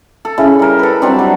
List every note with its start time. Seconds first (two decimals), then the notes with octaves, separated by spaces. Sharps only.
0.25 A4
0.38 C#3 E4
0.59 G3 A#4
0.79 A4 B4
1.02 F#3 G3 C4 D4
1.19 F#3